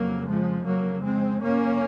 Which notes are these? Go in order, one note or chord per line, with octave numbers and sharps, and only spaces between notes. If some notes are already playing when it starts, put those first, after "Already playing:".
Already playing: F2 C#3 F#3 A#3
F3 G#3
F2 C#3 F#3 A#3
G#3 C4
F#2 C#3 A#3 C#4